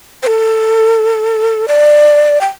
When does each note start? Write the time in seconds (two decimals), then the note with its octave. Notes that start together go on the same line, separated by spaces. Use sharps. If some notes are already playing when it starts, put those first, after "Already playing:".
0.23 C5
0.27 A4
1.68 D5
2.41 G5